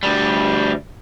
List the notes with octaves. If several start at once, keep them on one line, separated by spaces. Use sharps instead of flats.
D2 G3